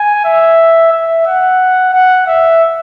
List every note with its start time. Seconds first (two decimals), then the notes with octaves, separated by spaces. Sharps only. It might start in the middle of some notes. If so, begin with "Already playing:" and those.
Already playing: G#5
0.25 E5
0.92 E5
1.27 F#5
1.93 F#5
2.27 E5